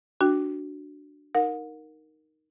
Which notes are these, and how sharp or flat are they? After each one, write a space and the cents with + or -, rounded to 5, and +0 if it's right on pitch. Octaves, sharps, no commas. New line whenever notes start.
D4 +0 F#4 +0 G5 +0
D#4 +0 A#4 +0 F#5 -45